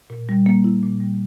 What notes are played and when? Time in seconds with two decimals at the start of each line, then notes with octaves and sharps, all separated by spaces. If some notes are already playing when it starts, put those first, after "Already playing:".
0.10 A#2
0.29 G3
0.46 A#3
0.64 E4
0.83 A#2
1.01 G3